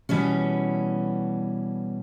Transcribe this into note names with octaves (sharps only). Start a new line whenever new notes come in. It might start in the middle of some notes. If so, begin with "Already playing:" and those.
B2 E3 G3 C#4